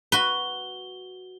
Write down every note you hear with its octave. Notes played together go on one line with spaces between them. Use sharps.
F#4 B4 G7